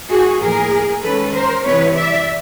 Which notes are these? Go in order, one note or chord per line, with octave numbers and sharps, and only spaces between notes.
F#4 G#4
A2 F3 A#3 G#4 A#4
D#3 G#3 C#4 A4 B4
A#4 C5
C3 E3 A3 C4 E4 B4 C#5
D5 E5